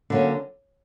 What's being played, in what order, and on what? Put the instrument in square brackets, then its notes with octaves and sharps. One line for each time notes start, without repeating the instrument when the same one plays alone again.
[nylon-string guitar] D3 F#3 A#3 C#4